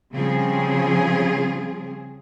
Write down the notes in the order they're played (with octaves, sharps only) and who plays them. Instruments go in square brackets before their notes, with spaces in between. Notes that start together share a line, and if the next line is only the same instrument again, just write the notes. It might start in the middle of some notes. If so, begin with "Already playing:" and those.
[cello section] C#3 F3 G3 C4 G#4